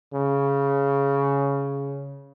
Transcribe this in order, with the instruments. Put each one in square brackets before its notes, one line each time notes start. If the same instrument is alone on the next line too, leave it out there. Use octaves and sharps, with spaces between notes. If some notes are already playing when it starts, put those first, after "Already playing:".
[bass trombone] C#3